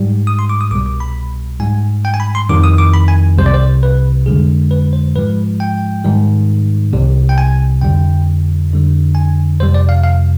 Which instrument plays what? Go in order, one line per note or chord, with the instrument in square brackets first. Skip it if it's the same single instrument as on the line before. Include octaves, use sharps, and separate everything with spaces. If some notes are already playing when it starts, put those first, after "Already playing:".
Already playing: [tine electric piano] G#2 G3
D#6
C6
D6
D#6
C2 D6
B2 G3
D6
B5
G#2 G3 G#5
G5
G#5
B5
C6
F2 D#3 G3 D6
D#6
D6
B5
G#5
C2 C3 G3 C5
D5
C5
B4
F2 D3 G#3 G#4
B4
C5
G#2 F3 G#3 B4
G5
G#2 D#3 G3
C2 C3 G3
G5
G#5
F2 D3 G3 G5
F2 D3 G3
G#5
F2 C3 G3 C5
D5
F5
F5